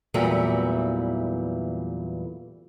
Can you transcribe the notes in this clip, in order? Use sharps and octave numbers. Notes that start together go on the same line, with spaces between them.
E2 A#2 E3 F#3 G3 A3